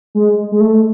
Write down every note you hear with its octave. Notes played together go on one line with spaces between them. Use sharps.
G#3
G#3
A3